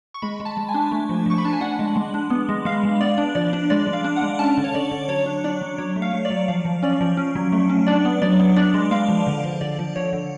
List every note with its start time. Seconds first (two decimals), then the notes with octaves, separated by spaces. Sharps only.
0.14 C#6
0.22 G#3 B5
0.40 G#3
0.45 A5
0.57 G#3
0.69 G#5
0.74 D4
0.92 A3
1.09 F3
1.26 F3 C#6
1.38 B5
1.45 D4 A5
1.53 G#5
1.61 D4 F#5
1.79 G#3
1.96 G#3
2.14 D4
2.30 B3
2.49 G#3
2.65 G#3 F5
2.84 G#3
3.01 B3 D5
3.18 D4
3.35 F3 D5
3.53 D4
3.70 G#3 D5
3.87 G#3
3.93 F5
4.04 D4
4.16 F#5
4.22 G#3
4.39 C#4 A5
4.57 D3
4.64 C#5
4.74 D3 D5
4.91 D3
5.09 F#3 C#5
5.26 D4
5.44 D4 D5
5.61 F#3
5.78 F#3 C#5
5.96 A3
6.02 F5
6.13 A3
6.25 D5
6.30 F#3
6.48 F3 F5
6.65 F3
6.83 C#4 D5
7.01 F3
7.17 C#4
7.35 F#3
7.52 A3
7.69 C#4
7.87 D4 D5
8.05 B3
8.22 F#3 D5
8.39 B3
8.56 D4 D5
8.74 G#3
8.91 G#3 F5
9.08 F3
9.27 D3
9.44 F3
9.61 D3 D5
9.79 F3
9.96 D3 C#5
10.13 D3